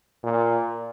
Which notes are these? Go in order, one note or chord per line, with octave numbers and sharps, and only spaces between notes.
A#2